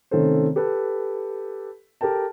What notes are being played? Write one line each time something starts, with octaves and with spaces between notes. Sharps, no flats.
C3 D#3 A3 C#4 A4 C5
G4 A4 B4
G4 A4 A#4 G5 A5